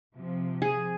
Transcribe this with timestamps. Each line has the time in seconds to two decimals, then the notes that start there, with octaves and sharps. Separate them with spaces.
0.14 C3 F3
0.62 G#4